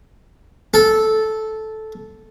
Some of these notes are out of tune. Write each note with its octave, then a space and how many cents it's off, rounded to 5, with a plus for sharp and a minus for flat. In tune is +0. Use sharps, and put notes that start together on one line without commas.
A4 -10